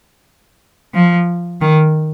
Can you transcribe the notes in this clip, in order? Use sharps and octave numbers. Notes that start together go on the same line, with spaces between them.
F3
D#3